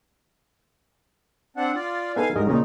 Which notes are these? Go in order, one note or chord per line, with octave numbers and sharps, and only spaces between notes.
C4 D4 F#5
F4 D5
B3 D#4 A4 F5 G#5
G#2 G3 A#4 D#5
A#2 C#3 D#4